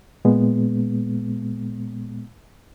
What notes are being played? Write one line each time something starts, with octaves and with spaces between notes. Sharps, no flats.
A#2 G#3 B3